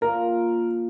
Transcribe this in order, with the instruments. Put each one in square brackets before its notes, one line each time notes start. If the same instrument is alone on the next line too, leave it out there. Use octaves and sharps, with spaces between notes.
[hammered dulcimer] A#2 F3 A#3 F4 [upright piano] A#4